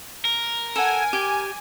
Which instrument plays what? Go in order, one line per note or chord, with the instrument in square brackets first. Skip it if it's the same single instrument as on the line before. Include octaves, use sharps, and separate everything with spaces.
[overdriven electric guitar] A#4
[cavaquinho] A4 F#5 [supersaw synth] G#5
[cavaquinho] G4